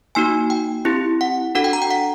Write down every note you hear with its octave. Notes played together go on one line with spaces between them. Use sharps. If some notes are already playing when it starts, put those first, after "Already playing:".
A#3 D#4 F#4 G#5
G5
C4 E4 G4
F#5
D4 F#4 A4 F#5
G5
A#5
G5
F#5